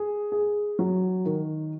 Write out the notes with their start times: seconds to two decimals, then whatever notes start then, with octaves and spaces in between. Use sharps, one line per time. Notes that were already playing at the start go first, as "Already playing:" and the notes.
Already playing: G#4
0.32 G#4
0.79 F#3
1.25 D#3